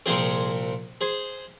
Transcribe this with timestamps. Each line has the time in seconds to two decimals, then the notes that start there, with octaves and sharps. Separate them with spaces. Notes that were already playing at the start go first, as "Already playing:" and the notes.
0.06 C2 A#2 F3 C4 G#4 C5
1.01 G#4 C5